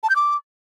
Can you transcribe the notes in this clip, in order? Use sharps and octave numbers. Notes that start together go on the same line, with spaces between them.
A5
G6
D6